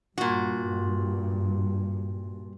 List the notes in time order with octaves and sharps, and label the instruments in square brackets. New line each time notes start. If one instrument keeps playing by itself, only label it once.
[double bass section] G2 [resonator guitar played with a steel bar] A#2 F#4